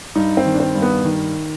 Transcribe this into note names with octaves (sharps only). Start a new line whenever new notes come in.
G2 D#4
C4
D#3
D4
C4
G2
B3
D#3